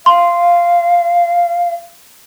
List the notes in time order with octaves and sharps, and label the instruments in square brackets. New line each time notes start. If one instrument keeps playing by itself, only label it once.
[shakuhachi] F5 [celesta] C6